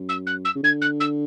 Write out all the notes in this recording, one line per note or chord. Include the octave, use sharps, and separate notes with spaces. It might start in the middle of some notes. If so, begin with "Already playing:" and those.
Already playing: F#2
E6
F#6
E6
C#3
D3 G#6
F#6
E6